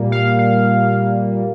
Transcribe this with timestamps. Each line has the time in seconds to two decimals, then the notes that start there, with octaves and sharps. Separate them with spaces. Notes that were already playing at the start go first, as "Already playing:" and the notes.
Already playing: A#2 G3 A#3
0.12 F5
0.39 F5